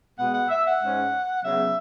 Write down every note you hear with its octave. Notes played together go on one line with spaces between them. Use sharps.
B2 G#3 B3 F#5
F#5
E5
F#5
G#2 G#3 C#4
C#3 F#3 B3 E5